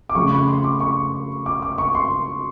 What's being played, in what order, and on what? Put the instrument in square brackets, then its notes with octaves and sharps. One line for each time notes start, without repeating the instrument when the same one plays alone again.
[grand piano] D6
C#3 F3 A3 C#4 C#6
B5
C6
D6
C#6
D6
D6
C#6
C6